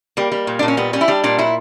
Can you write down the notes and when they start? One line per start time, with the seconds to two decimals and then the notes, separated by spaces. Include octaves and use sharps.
0.17 G3 A#3
0.32 G3
0.47 A#2
0.59 D4
0.63 A#2
0.68 C#4
0.77 G3 B3
0.93 G3 C#4
1.01 E4
1.08 G3 D4
1.24 A#2 D4
1.38 F#3 E4